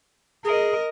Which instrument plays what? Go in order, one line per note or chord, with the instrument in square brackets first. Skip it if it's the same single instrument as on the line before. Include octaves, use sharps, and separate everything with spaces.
[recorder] G#4 [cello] A#4 D#5